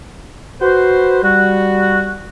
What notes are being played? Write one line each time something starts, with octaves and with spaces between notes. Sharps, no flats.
F#4 B4 C5
G3 F#4